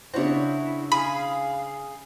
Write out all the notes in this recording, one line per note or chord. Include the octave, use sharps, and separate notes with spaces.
C#3 D4 E4 F#4 C5 C#5
G#4 F5 B5